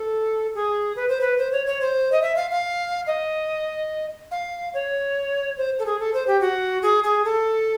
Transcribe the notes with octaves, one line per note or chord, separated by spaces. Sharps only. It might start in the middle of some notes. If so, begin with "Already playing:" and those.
Already playing: A4
G#4
B4
C5
B4
C5
C#5
C#5
C5
D#5
E5
F5
F5
D#5
F5
C#5
C5
A4
G#4
A4
C5
G4
F#4
G#4
G#4
A4